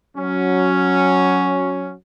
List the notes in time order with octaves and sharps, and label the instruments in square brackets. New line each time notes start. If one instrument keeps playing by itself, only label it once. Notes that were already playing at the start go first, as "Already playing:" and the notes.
[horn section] F#3 C#4